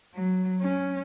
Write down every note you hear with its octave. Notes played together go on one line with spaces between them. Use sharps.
F#3
C#4